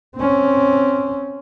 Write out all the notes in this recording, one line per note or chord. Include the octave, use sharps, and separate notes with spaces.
C4 C#4